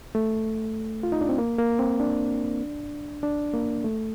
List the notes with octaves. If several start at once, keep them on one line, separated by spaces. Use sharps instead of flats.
A3
F4
D#4
D4
C4
A#3
A#3
C4
D4
D4
A#3
A3